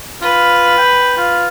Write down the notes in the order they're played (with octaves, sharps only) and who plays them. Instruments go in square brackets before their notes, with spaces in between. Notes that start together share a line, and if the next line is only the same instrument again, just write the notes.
[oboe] F4 [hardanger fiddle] B4
[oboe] G5
F4